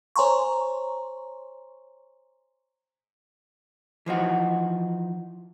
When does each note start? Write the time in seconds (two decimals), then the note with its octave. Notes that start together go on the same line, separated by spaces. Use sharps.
0.16 C5 C#5 G#5 A#5 C6 C#6
4.06 E3 F3 D#4 F#4